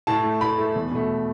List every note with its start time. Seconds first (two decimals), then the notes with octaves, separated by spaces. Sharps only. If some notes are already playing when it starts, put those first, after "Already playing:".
0.07 A2 A5
0.24 A3
0.41 A2 B5
0.58 A3
0.76 E2
0.91 B2 A3